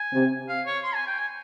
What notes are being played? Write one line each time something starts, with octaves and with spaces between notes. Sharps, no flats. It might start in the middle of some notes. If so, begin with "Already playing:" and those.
Already playing: G#5
C3
F5
C#5
C6
G#5
G5
G#5